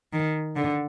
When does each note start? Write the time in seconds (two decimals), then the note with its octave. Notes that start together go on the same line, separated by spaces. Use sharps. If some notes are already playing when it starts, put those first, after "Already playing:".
0.13 D#3
0.56 D3